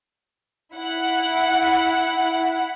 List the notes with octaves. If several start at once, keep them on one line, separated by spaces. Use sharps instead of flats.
E4 F#5